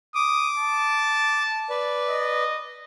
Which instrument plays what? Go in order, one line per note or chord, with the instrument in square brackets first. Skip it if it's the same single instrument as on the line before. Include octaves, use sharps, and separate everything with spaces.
[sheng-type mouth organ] D6 [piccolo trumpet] D#6
[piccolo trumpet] A5
[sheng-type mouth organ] B4 D5
[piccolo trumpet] D#5